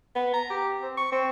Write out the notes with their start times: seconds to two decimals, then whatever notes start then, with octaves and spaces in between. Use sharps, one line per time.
0.16 B3
0.34 A#5
0.50 G4
0.82 C4
0.97 C#6
1.12 C4